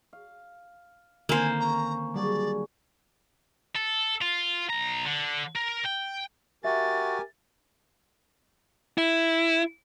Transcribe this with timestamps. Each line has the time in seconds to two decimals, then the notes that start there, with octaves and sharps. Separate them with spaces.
0.13 F5
1.29 D3 D#3 A#3 C4 C5 G#5
1.59 C#4 A#5
2.14 F#3 G3 D4 F#4 G#4 D5
3.76 A4
4.22 F4
4.69 B1 A#5
5.06 D3
5.56 A#4
5.85 G5
6.65 F#4 G4 A#4 E5 G#5 A6
8.98 E4